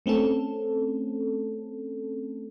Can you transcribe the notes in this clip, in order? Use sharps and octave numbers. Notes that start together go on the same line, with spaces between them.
A3 C4 C#4 A4